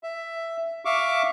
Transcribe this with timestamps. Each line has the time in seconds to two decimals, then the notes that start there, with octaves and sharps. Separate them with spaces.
0.03 E5
0.85 E5 F5 C#6 D6